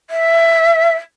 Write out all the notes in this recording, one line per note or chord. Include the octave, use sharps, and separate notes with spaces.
E5